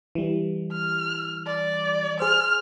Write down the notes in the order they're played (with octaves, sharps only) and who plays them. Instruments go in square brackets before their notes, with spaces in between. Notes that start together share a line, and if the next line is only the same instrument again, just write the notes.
[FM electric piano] E3 G3
[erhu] F6
D5
[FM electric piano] G#4 C5 [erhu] F6